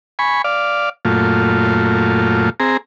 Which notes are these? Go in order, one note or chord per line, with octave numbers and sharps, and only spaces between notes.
G#5 B5 C#6
D5 F5
F#2 A#2 A3 F4
C4 G#4 A#5